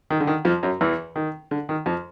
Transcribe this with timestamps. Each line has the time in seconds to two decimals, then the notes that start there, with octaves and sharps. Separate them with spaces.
0.10 D#3
0.20 D3
0.27 D#3
0.45 F2 F3
0.63 F#2 F#3
0.81 E2 E3
1.16 D#3
1.51 D3
1.69 D#3
1.86 F2 F3